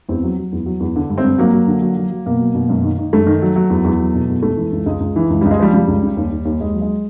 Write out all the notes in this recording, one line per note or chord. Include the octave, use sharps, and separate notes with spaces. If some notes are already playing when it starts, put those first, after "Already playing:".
E2 C4
F#3
F#3
E2
F#3
E2
D3
G2
C4
G2
F#3 A#3
F#3
D3
F#3
F#3
F#3
B2 A#3
F#3
B2
F#2
D#3
D#3
F#2 A3
D#3
F#3
F#3
E2
E2
F#3
B2
E2
C#2 A3
E3
C#2
C#2 G#3
C#2
E3
C#2
C#2 G3
G#3
F3 G3
C#3 G3
C#2
C#3
D#2
D#2
D#2
D#2 G#3
F#3
G#3